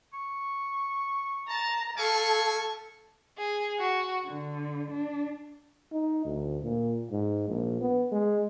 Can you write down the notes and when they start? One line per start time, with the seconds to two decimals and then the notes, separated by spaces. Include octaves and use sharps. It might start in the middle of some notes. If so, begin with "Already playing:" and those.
0.13 C#6
1.48 A5 A#5
1.98 G3 A4 F5 G#5 C#6
3.36 G#4
3.78 F#4
4.26 D3
4.92 D4
5.92 D#4
6.25 D2
6.63 A#2
7.11 G#2
7.48 A#1
7.81 B3
8.12 G#3